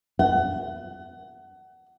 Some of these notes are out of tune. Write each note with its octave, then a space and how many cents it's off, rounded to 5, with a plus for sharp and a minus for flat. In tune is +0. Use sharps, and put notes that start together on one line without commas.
F#5 +25